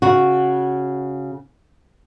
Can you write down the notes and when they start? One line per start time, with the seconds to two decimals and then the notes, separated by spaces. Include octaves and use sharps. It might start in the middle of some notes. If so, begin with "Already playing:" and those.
0.02 C#3 F#4